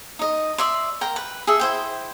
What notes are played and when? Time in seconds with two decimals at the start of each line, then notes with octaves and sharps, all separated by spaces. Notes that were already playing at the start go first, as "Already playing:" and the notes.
0.19 D#4 D#5
0.58 D5 E5 C6
1.01 A#4 G5 A#5
1.16 B4
1.47 G#4 A4 E5
1.59 E4 C5 G5